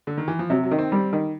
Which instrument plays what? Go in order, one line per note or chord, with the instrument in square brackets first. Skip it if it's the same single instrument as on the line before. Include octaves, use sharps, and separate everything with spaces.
[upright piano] D3
D#3
E3
F3
[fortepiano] C3 [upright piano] F#3
[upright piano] F#3
[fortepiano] D#3
[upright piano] C4
[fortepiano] G3
D#3